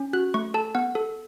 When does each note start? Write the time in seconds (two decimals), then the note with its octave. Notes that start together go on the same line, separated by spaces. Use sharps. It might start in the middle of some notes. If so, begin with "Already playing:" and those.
Already playing: C#4
0.13 F#4 F#6
0.34 A3 C#6
0.54 A4 A5
0.75 B3 F#5
0.95 A4